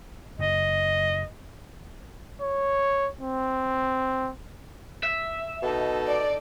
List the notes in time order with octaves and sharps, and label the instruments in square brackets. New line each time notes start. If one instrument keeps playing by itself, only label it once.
[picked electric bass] F#1 [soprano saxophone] D#5
[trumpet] C#5
C4
[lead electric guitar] E5
[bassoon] B2 [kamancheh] D#4 A4
[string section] D5